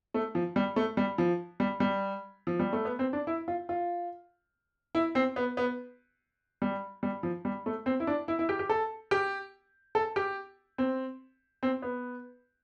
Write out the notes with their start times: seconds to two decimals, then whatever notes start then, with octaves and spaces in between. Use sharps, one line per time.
0.14 A3
0.35 F3
0.56 G3
0.76 A3
0.97 G3
1.18 F3
1.60 G3
1.80 G3
2.47 F3
2.60 G3
2.73 A3
2.85 B3
2.99 C4
3.13 D4
3.27 E4
3.48 F4
3.69 F4
4.95 E4
5.15 C4
5.36 B3
5.57 B3
6.62 G3
7.03 G3
7.23 F3
7.45 G3
7.66 A3
7.86 C4
8.00 E4
8.07 D4
8.28 E4
8.39 E4
8.49 G4
8.59 G4
8.69 A4
9.11 G4
9.95 A4
10.16 G4
10.78 C4
11.63 C4
11.82 B3